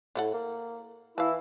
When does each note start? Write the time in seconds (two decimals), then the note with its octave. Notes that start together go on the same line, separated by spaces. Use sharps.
0.15 A2 E4 A4 F#5
0.34 A#3
1.18 E3 E4 F5 A5